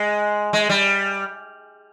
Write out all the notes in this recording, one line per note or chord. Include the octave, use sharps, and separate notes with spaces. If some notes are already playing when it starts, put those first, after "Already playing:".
Already playing: G#3
G#3
G3